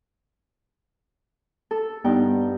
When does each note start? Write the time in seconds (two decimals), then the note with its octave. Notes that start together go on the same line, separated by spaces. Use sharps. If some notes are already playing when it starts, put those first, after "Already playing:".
1.71 A4
2.04 G2 B3 D#4 G5